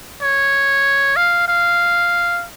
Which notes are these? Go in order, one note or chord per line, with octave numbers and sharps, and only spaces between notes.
C#5
F5
F5